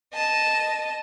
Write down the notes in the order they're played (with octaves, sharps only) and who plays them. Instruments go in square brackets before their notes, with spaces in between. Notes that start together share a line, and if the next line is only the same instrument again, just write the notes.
[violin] D#5 A5